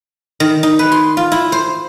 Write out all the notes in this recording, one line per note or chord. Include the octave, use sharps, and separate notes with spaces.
D#3
D#4
B4
C6
F4
E4
C5